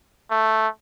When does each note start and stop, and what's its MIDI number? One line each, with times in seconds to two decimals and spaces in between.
0.31 0.68 57